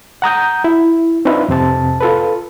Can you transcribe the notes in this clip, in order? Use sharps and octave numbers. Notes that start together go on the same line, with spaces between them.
F#5 A#5 D#6 G6
E4
C4 D4 D#4 F4 B4 E5
F2 C3 C4 A5
F4 A4 B4